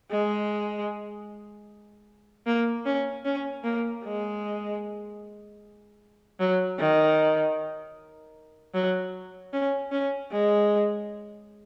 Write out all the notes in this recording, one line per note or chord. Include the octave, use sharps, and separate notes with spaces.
G#3
A#3
C#4
C#4
A#3
G#3
F#3
D#3
F#3
C#4
C#4
G#3